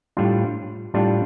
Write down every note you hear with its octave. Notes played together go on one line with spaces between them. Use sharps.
A2 G3 D4 F4
A2 G3 D4 F4